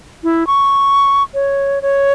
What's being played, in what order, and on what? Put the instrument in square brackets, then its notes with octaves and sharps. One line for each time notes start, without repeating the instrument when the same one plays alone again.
[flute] E4
C#6
C#5
C#5